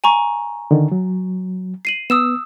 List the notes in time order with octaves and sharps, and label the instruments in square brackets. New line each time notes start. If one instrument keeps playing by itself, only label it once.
[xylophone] G#5 A#5 C#6
[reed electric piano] D3 D#3
F#3
[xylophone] C7 D#7 F#7
[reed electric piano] B3 [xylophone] D#6 E6 E7